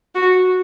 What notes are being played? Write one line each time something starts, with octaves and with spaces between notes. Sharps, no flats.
F#4